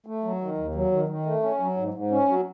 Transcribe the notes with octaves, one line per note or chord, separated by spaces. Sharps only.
A3
F#3
D#3
D#2
F#3
D#3
D#3
A3
C#4
F#3
G#2
G#2
C#4
F#3